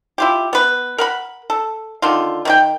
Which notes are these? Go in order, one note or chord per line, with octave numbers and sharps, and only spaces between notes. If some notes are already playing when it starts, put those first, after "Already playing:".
E4 F4 G4
B3 B4
A#4 F#5 B5
A4
D3 D#3 F4
D#3 F#4 G5